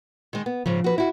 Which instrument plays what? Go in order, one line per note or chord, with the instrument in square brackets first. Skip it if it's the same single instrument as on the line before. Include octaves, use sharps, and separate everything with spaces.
[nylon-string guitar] D#3 G#3
B3
[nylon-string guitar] G#2 C#3 [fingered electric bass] F3
[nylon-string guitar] F#4 B4
E4 F#4